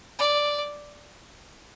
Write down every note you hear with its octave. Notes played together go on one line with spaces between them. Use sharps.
D5